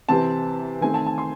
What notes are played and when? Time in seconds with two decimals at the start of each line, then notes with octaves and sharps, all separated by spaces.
0.09 C3 E3 C4 A5
0.81 D#3 A3 C4 G#5
0.94 A5
1.06 A5
1.18 C6